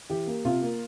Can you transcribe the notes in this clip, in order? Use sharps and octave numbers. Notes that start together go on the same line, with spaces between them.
E3 G4
A#3
C3 F4
A#3